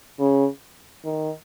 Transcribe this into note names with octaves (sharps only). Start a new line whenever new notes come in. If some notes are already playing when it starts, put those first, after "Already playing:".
C#3
D#3